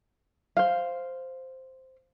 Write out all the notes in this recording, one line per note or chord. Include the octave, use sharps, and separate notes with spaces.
C5 F5